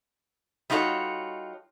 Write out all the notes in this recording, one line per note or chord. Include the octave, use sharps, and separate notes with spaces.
G3 D#4 F4 F#4 A4 C#5